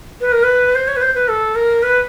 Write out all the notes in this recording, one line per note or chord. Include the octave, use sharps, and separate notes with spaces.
B4
A#4
B4
C5
C#5
B4
C5
B4
A4
A#4
B4